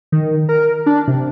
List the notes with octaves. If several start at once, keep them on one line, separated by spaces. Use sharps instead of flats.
D#3
A#4
D4
C3